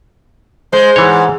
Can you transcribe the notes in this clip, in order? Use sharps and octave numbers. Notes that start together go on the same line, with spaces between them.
G#3 C5
G#2 E3 C#5